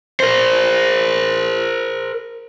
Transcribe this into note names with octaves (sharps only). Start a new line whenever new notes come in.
A#4 C5